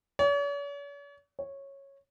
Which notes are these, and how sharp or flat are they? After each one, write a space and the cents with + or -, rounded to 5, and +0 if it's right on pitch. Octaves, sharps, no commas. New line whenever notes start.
C#5 +45
C#5 -10